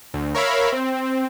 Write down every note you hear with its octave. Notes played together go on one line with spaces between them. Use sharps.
D2
A#4 C#5 E5 F5 B5
C4